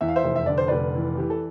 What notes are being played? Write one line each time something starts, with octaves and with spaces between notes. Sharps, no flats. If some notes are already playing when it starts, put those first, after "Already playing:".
E2 E5
F5
C5 E5
F1
E5
D3 D5
C5
F1 B4 D5
E3
E3 G4
A4